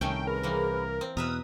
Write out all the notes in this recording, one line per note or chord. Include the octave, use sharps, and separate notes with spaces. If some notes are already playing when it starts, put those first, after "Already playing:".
C2 D#3 A3 C#4 G5
G#4 A#4 B4 B5
E3 A#3 C4
C4
E2 B2 B4 E5 A#5 D#6 F6 F#6